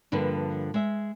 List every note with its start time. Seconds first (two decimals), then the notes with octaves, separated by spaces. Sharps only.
0.12 G2 D3 F3 A#3 B4
0.74 G#3 E5